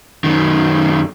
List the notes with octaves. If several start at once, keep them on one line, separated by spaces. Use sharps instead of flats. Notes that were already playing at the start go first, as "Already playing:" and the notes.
F#2 D#3